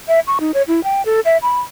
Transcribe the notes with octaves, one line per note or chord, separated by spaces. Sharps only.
E5
C#6
D#4
C#5
E4
G5
A4
E5
B5